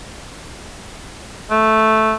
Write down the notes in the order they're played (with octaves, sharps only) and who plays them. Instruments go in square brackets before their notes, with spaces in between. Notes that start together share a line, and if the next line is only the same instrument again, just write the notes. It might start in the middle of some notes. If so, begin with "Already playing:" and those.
[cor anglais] A3